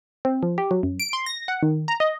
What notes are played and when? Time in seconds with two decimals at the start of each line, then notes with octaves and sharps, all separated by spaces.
0.25 C4
0.43 F3
0.58 G4
0.71 F#3
0.83 F#2
1.00 D7
1.13 C6
1.26 A#6
1.48 F#5
1.63 D#3
1.88 A#5
2.00 D#5